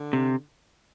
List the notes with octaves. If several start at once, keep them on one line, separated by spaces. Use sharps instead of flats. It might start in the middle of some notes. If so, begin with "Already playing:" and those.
Already playing: D3
C3